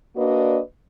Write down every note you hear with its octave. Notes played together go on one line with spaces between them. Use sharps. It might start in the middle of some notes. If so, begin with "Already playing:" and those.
A#3 D4 F#4 B4 D5 D#5